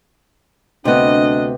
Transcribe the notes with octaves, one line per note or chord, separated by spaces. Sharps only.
D2 C3 B3 D4 D#5